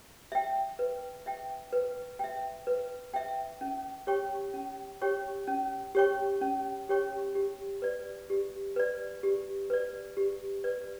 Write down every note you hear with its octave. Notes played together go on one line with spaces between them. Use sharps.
E5 G5
B4
E5 G5
B4
E5 G5
B4
E5 G5
C#4
G4 C#5 G5 C#6
C#4
G4 C#5 G5 C#6
C#4
G4 C#5 G5 C#6
C#4
G4 C#5 G5 C#6
G4
B4 D5
G4
B4 D5
G4
B4 D5
G4
B4 D5